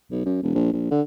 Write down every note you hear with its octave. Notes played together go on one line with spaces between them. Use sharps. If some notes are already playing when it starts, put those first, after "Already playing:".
B1
F#2
E1
A#1
A#1
D3